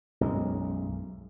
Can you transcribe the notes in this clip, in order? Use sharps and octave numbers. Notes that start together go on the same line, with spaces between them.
B1 F#2 G#3